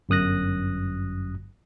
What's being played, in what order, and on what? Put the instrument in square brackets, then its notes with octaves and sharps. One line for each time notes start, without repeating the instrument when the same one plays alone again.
[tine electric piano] G1 F#2 D#6 F#6 A#6